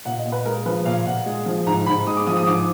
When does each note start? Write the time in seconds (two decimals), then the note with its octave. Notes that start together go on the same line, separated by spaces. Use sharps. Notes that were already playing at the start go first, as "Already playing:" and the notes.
0.05 A#2 F#5
0.19 D#5
0.25 A#2
0.32 B4
0.45 G#3 A#4
0.66 F3 B4
0.85 A#2 F5
1.06 A#2 F#5
1.26 G#3
1.46 F3
1.67 G#2 A#5
1.86 G#2 B5
2.07 G#3 D#6
2.17 D6
2.27 F3 D#6
2.37 D#6
2.47 G#2 D6